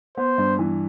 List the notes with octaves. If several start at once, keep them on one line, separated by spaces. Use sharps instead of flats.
B3 C5
G2
E3